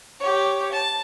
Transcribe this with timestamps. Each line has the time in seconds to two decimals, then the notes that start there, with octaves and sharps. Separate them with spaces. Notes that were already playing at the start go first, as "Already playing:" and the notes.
0.20 G4 C#5
0.72 A5